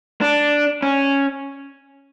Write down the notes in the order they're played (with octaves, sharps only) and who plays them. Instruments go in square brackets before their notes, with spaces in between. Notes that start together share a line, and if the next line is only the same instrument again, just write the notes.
[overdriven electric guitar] D4
C#4